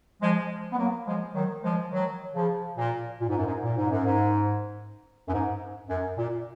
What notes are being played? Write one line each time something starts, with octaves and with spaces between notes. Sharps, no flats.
F3 G#3
B3
F#3 A#3
F3 G#3
D#3 F#3
F3 G#3
D#3 F#3
C#3 F3
A#2
A#2
G#2
F#2
G#2
A#2
G#2
F#2
G#2
F#2
G#2
F#2
A#2